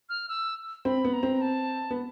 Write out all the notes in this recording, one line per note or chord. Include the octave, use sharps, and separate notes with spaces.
F6
E6
C4 B5
B3
A#5
C4
A5
B3